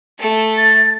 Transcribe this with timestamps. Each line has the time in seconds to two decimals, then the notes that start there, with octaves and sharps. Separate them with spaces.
0.19 A3 A4
0.58 A6